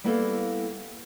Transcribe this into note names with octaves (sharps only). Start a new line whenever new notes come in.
G3 A#3 B3 E4 A4 F5